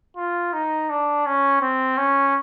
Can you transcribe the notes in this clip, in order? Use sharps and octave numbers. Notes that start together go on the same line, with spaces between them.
F4
D#4
D4
C#4
C4
C#4